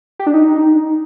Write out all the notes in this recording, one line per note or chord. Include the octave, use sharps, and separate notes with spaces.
G4
D4
D#4